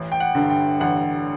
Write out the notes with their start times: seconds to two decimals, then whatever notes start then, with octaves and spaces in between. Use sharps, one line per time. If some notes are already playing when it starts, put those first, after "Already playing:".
Already playing: A1
0.12 G5
0.20 F#5
0.35 G2 D3
0.50 G5
0.80 A1 F#5